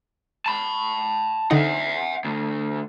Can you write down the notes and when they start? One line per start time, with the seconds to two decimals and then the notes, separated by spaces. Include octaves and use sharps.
0.46 A5 B5
1.51 D3 C4 D#4 E5 F#5
2.24 D2